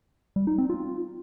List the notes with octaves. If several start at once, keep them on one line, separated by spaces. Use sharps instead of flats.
G3
D#4
C4
F4